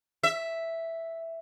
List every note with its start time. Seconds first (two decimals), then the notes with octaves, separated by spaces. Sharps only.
0.23 E5